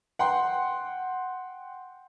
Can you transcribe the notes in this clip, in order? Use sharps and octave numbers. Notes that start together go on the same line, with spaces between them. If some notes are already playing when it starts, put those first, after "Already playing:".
F#5 G5 C6